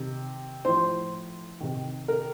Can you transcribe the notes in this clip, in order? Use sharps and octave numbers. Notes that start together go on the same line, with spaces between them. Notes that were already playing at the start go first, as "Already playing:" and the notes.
Already playing: C3 D#3
A2 F3 C5
C3 D#3
A#4